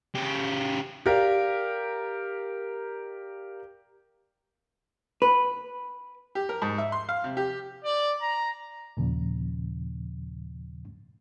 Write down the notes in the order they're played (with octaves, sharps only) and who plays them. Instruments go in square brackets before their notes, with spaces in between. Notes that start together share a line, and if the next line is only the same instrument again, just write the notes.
[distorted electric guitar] C#3 G4
[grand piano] G4 A#4 D5 F5
[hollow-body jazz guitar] B4
[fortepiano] G4
A#4
G#2
E5
C6
F5
C3
G4
[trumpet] D5
A#5
[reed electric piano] D#2 A#2 C#3 F3